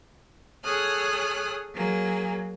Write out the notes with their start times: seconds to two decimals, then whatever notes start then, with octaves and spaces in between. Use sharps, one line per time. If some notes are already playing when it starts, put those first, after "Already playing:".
0.64 G#4 A4 C#5 D#6 F6 F#6
1.74 F#3 A#3 G#4